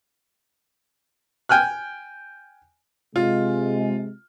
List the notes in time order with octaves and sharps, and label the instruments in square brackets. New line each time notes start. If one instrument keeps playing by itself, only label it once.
[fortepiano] G5 G#5 F6 F#6
[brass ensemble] C3 G#3 [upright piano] F4